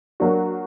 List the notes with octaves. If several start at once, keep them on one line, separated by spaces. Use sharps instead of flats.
F#3 A#3 D4 F#4